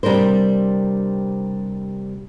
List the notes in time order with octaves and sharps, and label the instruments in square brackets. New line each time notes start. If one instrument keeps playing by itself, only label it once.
[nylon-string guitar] C3 G3 D4 A#4 C5